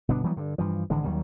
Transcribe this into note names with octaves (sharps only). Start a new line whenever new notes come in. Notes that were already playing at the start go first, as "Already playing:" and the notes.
G1 B2 B3 D4
E3 F#3 G3 B3
G2 D3
G2 E3 F3
G#1 D3 E3 G#3
D#2 D#3 F#3 G3